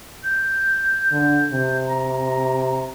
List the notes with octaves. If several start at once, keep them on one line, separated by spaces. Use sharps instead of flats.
G6
D3
C3
A#5